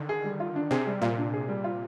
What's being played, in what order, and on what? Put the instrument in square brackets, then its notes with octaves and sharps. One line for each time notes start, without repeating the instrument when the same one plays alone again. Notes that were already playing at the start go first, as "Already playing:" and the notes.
Already playing: [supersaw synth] D3 D#3
[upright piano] G#4
G3
F4
D4
[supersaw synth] C3 [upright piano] G#4
[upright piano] G3
[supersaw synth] A#2 [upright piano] F4
[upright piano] D4
G#4
G3
F4